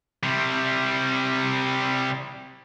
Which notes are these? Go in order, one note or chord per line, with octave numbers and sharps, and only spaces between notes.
C3 G3